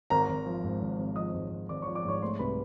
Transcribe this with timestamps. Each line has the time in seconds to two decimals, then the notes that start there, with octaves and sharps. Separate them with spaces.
0.10 G#1 A#4 A#5
0.29 G#1
0.46 F3
0.64 G#2
0.81 G#1
0.99 G#1
1.16 F3 D#5 D#6
1.34 G#2
1.51 G#1
1.69 G#1 D5 D6
1.82 C#5 C#6
1.87 F3
1.95 D5 D6
2.04 G#2 C#5 C#6
2.22 A3 C5 C6
2.39 C2 B4 B5